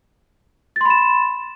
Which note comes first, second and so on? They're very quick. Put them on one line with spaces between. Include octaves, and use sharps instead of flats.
A6 C6 B5 E7